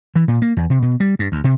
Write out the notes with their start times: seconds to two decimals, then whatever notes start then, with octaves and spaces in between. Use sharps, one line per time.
0.16 E3
0.28 A#2
0.42 A#3
0.57 E2
0.70 C3
0.82 B2
1.00 G3
1.19 G2
1.32 D2
1.44 C3